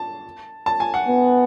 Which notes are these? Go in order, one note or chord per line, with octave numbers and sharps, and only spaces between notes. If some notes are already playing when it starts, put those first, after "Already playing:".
Already playing: A5
A5
G#5
F#5
B3